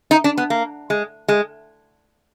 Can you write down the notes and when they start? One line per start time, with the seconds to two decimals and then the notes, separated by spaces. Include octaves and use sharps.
0.11 D#4
0.24 D4
0.38 B3
0.50 A#3
0.90 G#3
1.28 G#3